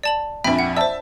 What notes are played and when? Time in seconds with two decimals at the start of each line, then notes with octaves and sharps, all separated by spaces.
0.03 D5 A5 F#7
0.44 A#1 F2 E5 G5 B5
0.59 F#5
0.77 C5 D5 E5 A5